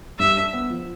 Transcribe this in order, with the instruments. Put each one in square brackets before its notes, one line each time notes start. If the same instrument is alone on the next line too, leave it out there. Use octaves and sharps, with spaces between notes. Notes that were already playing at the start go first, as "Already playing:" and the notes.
[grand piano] G2 [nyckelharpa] E5
[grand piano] D4
B3
F3